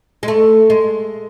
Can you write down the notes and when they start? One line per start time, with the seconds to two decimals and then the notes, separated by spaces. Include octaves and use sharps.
0.23 G#3
0.28 A3
0.70 G#3